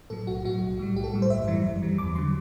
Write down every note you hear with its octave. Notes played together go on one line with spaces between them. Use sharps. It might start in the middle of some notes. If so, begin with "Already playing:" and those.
A2 F#3 A4
B1 F#4
A2 F#3 F#4
B1
A2 G3
B1 G4
A4
A2 G3
C5
G1 E5
F#2 E3 G3
G1
F#2 E3 G3
E2 D6
D3 F#3 C6